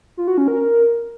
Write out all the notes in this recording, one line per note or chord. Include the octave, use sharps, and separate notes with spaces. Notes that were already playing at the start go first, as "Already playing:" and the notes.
F4
F#4
C#4
A#4